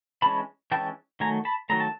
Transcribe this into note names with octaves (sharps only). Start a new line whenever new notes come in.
E3 G#3 C#4 A5 B5
E3 G#3 C#4 G5 A5
D#3 F#3 A3 G#5 A#5
A5 B5
D#3 F#3 A3 A#5
A5